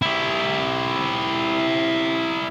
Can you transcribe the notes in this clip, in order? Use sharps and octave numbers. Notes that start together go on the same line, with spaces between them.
E4 G4